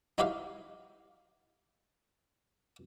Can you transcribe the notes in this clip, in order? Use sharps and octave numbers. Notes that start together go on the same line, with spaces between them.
D#4 E4 F#4 G4 E5 F5